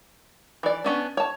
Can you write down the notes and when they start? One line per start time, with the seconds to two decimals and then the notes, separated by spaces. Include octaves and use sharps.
0.63 E3 D5
0.84 B3 C#4 D4
1.17 C#5 A5